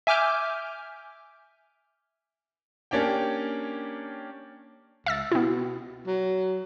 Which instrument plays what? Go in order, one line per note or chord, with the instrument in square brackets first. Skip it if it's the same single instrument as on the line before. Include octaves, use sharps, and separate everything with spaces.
[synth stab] E5 G#5 D6 F6 G6
[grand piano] A#3 C#4 D4 G4 G5
[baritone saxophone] C#2 [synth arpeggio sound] E5 E6 A6
[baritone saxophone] B2 [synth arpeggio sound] B3 E4
[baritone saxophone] F#3